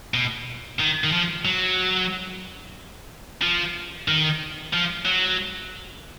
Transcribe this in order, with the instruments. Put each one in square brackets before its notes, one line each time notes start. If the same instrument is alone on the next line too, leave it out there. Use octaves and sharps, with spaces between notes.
[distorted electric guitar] B2
D#3
D#3
F3
F#3
F3
D#3
F3
F#3